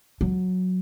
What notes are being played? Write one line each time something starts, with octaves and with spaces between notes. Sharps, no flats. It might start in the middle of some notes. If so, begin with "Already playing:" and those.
F#3